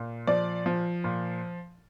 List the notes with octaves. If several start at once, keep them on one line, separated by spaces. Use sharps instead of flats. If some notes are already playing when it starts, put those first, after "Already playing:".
Already playing: A#2
F3 D5
F3
A#2